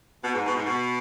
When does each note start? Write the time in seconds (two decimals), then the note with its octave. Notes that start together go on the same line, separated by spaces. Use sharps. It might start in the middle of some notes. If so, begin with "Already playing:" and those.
0.24 B2
0.35 G#2
0.46 B2
0.55 G#2
0.66 B2